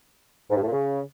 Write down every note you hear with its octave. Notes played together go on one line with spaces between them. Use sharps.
G#2
G2
A2
A#2
C#3